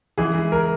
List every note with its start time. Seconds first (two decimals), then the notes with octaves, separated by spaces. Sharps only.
0.18 E3 G#4
0.35 G#3
0.52 A#4